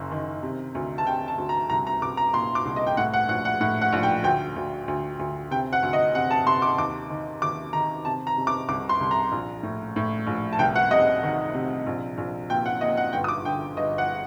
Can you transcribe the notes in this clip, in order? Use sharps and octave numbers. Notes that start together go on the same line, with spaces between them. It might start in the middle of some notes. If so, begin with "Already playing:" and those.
Already playing: F#1 F#2
D#3
C3
D2
A5
C3 G5
A5
D2
A#5
C2 A#5
A#5
C2 D6
A#5
A#2 C6
D6
C2
D#5
G5
A2 F#5
F#5
A#1 F#5
F#5
A2 F#5
F#5
A#1
G5
D2 G5
D2
D2
D2
C3 G5
F#5
D2
D#5
C3 F#5
A5
C3 C6
D6
D#2 D6
D#3
D#2 D6
D#3 A#5
C3 A5
A#5
C3
D6
C2 D6
C6
C2
A#5
A#1
A2
A2
A#1
A5
C2 G5
F#5
C3 D#5
D#3
C3
A#1
A#1
A#2 G5
F#5
A#2 D#5
F#5
G1 G5
D#6
D6
D3 G5
G1 D#5
F#5